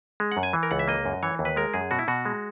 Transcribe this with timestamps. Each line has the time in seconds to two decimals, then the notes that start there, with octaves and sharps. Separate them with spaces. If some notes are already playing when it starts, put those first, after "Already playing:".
0.20 G#3
0.32 F#5
0.37 F#2
0.43 G#5
0.53 E3
0.63 A#4
0.71 C#2 F#5
0.79 E5
0.88 A#3 D#5
1.05 F#2
1.23 E3 C#5
1.39 D#2
1.45 B4
1.56 G#3 A#4
1.74 F#2 G#4
1.91 B2 F#4
1.99 E4
2.08 B2 F#4
2.25 G#3